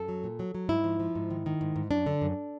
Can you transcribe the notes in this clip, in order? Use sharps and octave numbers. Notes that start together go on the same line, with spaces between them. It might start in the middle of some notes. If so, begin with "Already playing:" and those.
Already playing: F#2 A4
F#3
A#2
F#3
F#3
G#2 E4
F3
F3
G#2
D#3
D#3
G#2
G#2
F#2 D4
D3
F#2